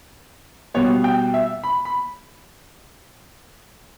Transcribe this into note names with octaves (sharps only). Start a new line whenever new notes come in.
B2 G3 B3 C#5
G5
E5
B5
B5